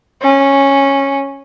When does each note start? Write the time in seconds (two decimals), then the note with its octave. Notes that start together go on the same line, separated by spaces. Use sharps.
0.22 C#4